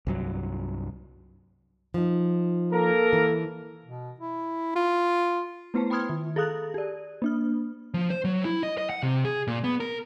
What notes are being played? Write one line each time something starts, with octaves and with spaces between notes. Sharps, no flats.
C2 G2 F#3
F3 D#4
A#3 A4 A#4
E3
B2
E4
F4
A3 B3 E4 B4 C5 A5
G5 B5 C6 D#6 F6 G#6
D#3
G#4 A4 F5 D#6 F#6
G4 D5
A#3 D4 F6
F3
C5
F#3
E4
D#5
D#5
F#5
C3
G#4
A#2
B3
A#4